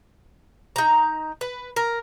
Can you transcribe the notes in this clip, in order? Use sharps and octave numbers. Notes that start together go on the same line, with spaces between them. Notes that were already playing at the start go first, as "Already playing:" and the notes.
D#4 A#5
B4
A#4